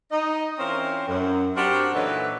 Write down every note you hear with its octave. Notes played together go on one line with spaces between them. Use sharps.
D#4 D#5
E3 C4 C#4 F4 A#4 C5
F#2
C4 D4 F#4 G4 A#4 C5
A#2 E3 F#3 D#4 A4 B4